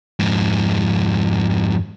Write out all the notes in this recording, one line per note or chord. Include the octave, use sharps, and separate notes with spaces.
F2 G#2